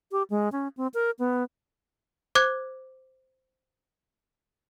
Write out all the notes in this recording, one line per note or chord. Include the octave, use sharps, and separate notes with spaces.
G4
G#3
C#4
C4
A#4
B3
C5 D6 F#6 G#6